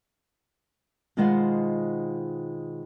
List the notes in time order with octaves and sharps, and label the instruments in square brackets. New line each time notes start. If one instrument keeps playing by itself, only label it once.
[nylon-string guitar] B2 D#3 G#3 F4 C5 F#5